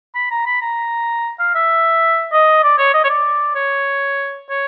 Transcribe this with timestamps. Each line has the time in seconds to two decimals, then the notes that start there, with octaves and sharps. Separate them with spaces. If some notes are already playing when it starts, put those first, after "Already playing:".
0.15 B5
0.31 A#5
0.46 B5
0.62 A#5
1.39 F5
1.55 E5
2.33 D#5
2.63 D5
2.78 C#5
2.94 D#5
3.04 C#5
3.09 D5
3.55 C#5
4.49 C#5